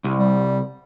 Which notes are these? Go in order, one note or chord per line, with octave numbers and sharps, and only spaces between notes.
C2
G3